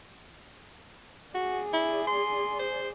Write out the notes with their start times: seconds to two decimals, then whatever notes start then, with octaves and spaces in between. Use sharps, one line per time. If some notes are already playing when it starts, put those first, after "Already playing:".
1.34 F#4 G#4 D5
1.73 E4
2.07 C6
2.59 C5